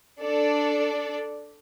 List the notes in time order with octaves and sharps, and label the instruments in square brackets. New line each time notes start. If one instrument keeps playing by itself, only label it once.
[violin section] D4 A4 D5